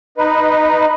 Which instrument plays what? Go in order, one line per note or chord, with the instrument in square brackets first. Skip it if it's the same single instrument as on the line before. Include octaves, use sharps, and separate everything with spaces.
[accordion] D#4 B4